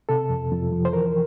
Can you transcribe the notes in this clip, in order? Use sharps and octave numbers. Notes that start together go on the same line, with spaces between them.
C3 A4
F2
F2
F3
C5
E3 A#4